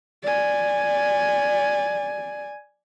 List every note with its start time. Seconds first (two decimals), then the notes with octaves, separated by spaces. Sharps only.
0.23 D5 G#5